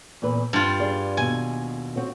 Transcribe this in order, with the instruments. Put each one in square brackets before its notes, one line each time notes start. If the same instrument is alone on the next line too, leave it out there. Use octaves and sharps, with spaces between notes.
[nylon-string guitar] E2 A#2 B4
[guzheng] G2 F4 [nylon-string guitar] C4
[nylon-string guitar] G#4 D5
[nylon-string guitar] D#2 B2 [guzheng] G#5
[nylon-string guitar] C4 F#4 C#5